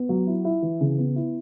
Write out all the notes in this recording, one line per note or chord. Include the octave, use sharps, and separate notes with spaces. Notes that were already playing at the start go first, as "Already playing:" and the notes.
Already playing: B3
F#3
E4
E4
E3
C#3
B3
E4